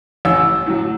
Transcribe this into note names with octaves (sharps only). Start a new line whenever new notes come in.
A1 E6
A2 F#3